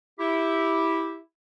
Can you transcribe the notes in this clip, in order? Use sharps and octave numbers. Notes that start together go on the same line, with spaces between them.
E4 G4